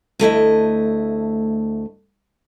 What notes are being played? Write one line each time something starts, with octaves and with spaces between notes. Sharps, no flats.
D2 A3 E4 D#5